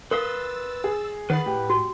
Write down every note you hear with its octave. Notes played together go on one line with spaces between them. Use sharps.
A#4 B4 F5 C6 D#6 E6 A6
G#4
D#3 B4 F#5 B5 A6 C7
A2 G4
F#4